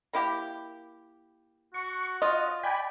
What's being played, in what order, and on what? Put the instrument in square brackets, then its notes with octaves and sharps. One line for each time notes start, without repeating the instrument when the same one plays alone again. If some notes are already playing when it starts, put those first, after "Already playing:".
[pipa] A#3 E4 G4
[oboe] F#4 [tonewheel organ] C#6
[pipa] F4 [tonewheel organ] D#5
[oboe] D5 [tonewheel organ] G5 G#5 B5